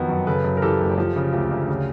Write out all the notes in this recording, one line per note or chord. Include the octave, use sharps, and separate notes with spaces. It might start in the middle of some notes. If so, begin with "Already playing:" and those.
Already playing: F2 D#3 F#3 B3
F#2
C#3 A4 B4
F#2
A#4
E3 G4 A4
F#1
F3
C#3
D2 F4 G4
D2
C#3